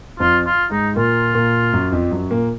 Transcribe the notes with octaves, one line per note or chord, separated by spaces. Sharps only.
F2 F3 F4
F4
G#2 G#3 D#4
A#2 A#3 F4
A#2 A#3
F#2 F#3
F2 F3
F#2 F#3
A#2 A#3